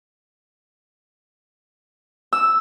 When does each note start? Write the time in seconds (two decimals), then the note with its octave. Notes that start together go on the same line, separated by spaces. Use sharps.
2.33 E6